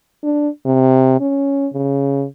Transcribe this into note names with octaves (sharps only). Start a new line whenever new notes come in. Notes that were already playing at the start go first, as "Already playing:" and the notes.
D4
C3
C#4
C#3